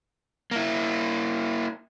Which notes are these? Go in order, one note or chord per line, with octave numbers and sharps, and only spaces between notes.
A#3 E4